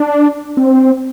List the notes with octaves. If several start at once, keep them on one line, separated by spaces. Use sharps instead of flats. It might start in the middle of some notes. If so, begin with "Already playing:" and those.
Already playing: D4
C4